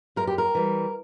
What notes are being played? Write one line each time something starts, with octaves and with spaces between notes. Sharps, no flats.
F#2 A#4
G4
A#4
E3 G3